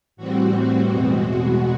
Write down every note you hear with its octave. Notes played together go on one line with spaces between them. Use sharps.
A2 E3 G3 C4 F#4
E2 B2 G#3 F#4
F#4